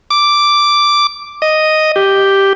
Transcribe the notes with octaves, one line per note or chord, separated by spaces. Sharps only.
D6
D#5
G4